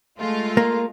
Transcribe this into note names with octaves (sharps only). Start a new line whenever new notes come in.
G#3 A3 F4
A#3